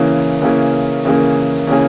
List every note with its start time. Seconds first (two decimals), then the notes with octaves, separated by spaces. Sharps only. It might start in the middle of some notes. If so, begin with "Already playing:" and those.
Already playing: C#3 E3 A#3 C#4 G#4
0.41 C#3 E3 A#3 C#4 G#4
1.05 C#3 E3 A#3 C#4 G#4
1.67 C#3 E3 A#3 C#4 G#4